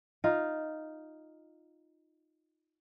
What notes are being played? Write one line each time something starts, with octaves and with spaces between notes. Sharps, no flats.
D#4 F4